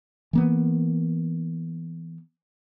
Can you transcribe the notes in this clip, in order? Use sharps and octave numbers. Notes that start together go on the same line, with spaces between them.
E3 A#3 B3